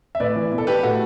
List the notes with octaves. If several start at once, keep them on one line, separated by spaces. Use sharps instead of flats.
E5
A2 B4 D5
E3
B2
A4
G4 B4
A2 F#4 A4